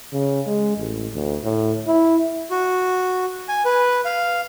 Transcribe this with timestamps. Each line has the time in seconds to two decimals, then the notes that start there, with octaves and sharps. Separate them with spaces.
0.13 C#3
0.47 G#3
0.77 A1
1.14 D2
1.44 A2
1.87 E4
2.51 F#4
3.49 G#5
3.65 B4
4.05 F5